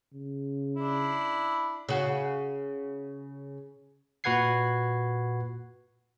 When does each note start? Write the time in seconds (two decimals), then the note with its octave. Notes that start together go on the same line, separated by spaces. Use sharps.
0.14 C#3
0.77 D4 E4
1.89 C#3 F#4
4.24 A#2 F#4 B4 F#5 G#6 C7